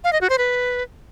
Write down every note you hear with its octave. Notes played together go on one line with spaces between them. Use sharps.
F5
D#5
F#4
C5
B4